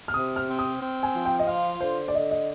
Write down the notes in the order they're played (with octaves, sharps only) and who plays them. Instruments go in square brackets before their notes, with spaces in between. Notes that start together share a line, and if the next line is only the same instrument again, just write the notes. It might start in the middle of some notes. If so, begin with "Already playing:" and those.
[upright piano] F6
[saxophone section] C3 [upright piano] D#6
[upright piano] F6
[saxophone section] C4
[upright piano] D#6
[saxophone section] C4
[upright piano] G#5
[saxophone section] F3
[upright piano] G5
D#5
[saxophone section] F4 [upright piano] F5
[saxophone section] D3 [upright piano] C5
[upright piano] D5
[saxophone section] D3 [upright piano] D#5
[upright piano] D#5